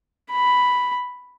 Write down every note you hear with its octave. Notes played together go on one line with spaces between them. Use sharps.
B5